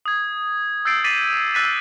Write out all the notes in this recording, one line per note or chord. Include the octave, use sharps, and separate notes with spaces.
D#6 G#6
E6 G6 A6 C7 D7
D6 A6 B6 C7 D#7 F#7
E6 F#6 A6 B6 D#7